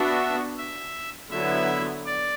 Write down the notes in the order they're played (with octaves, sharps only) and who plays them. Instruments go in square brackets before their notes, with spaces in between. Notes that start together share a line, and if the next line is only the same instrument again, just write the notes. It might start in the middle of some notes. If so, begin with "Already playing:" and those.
Already playing: [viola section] B3 D4 F#4 [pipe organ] E5
[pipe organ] E5
[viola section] D3 F#3 B3 E4 [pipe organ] E5
[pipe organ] D5